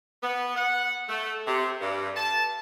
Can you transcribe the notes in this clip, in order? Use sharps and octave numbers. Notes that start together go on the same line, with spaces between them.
B3
F#5
A3
C3
G2
A5